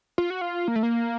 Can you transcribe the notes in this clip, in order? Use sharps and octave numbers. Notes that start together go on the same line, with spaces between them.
F4
F#4
F4
A#3
A3
A#3